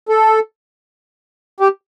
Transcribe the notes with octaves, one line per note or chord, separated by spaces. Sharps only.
A4
G4